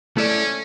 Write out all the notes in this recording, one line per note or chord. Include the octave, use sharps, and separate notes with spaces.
A3 C#4 E4 A4 D5